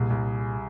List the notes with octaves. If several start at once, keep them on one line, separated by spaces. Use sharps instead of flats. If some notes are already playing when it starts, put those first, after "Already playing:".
Already playing: C2 A#2 G#4
C2